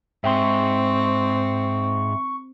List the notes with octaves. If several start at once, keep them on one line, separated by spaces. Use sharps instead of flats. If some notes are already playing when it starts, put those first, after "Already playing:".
G#2 C4 E5 G5 C6 C#6